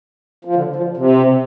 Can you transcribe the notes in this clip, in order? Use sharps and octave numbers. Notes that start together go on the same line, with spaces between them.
F3
D3
F3
C3